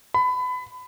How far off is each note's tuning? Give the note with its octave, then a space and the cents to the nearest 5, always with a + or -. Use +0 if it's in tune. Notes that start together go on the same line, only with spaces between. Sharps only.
B5 +25